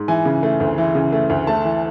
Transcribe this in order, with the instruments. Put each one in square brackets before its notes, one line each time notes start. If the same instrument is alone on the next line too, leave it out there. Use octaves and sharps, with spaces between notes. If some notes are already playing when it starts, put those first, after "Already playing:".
Already playing: [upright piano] G#2
E3 G#5
C#3
A3
D2
E3
C#3
A3
D2
A3 A5
E3